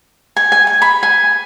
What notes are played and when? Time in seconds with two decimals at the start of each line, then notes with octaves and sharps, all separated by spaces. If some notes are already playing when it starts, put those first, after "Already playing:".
0.36 G#5
0.52 G#5
0.67 G#5
0.82 B5
1.03 G#5